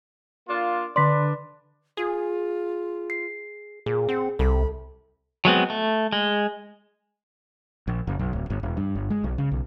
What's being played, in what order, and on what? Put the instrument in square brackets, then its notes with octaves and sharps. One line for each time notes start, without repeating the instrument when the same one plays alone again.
[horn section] A#3 D4 F4
[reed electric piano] D3 D5 [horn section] D4 B4 [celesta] C6 B6
[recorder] F4 [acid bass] G#4
[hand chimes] C7
[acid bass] A#2 [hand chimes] G#4
[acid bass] C4 [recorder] F#5
[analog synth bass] C2 [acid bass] C3 [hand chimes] A4 [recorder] B5
[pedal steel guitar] F#3 G#3 B3 C4
A3
G#3
[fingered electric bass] A#1
F#1
B1
D1
G1
E1
G2
G1
G#3
B1
C#3
B1